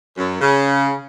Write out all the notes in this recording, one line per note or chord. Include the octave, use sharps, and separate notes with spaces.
F#2
C#3